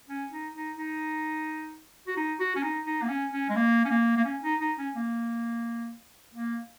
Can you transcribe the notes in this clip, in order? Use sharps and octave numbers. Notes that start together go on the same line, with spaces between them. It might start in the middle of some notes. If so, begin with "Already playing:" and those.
C#4
D#4
D#4
D#4
F#4
D#4
F#4
C#4
D#4
D#4
A#3
C#4
C#4
G#3
A#3
C#4
A#3
A#3
C#4
D#4
D#4
C#4
A#3
A#3